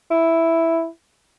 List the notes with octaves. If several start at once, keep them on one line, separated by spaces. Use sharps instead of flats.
E4